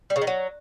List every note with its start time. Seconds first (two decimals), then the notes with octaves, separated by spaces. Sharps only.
0.10 G3
0.16 C#3
0.21 D#3
0.27 F#3